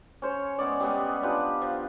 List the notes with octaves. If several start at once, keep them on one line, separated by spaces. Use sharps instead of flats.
C#4 C5 C#5
G#3 B3 C#4 D5
G3 G#3 B3 G#4
D4 F4 G4 B4
F3